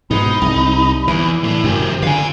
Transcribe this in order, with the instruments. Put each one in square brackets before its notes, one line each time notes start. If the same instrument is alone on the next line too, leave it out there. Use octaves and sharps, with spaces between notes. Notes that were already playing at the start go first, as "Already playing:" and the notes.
[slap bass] G#2 B2 [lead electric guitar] D#4 [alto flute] B5
[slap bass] C2
[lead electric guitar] E2 [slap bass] E3
[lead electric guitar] A2 A3 [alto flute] D4
[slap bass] F#2 [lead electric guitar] C#3 G4 [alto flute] C5
[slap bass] D3 [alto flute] F4 [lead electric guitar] F5 G#5